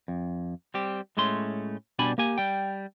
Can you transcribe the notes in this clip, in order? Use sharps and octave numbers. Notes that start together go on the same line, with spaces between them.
F2
G3 C4 G4
A2 G#3 A3 C#4 C6
B2 G3 D4 G#5 B5
A#3 G4 G#5
G3 G5